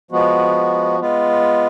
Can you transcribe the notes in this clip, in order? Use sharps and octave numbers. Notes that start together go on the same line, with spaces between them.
F3 G#3 B3 F#4
G#3 B3 F4